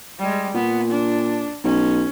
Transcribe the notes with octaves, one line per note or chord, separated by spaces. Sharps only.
G3 G#3
A#2 B3
D4
B1 C#4